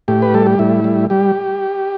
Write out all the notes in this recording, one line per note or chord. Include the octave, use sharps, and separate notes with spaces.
A2 G4
B4
G3 A4
G4
A2 E4
G3
G3 G4